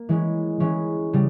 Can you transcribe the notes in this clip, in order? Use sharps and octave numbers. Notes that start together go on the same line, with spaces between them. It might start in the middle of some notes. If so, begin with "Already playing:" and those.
Already playing: A#3
E3 G#3 C#4
E3 G#3 C#4
C#3 G3